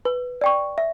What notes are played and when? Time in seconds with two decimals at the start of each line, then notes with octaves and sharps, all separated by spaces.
0.05 B4
0.41 D5 G5 C#6
0.78 E5